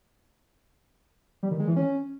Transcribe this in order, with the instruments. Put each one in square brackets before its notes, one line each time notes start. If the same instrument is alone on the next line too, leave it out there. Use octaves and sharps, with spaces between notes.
[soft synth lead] G3
D#3
G#3
E3
C#4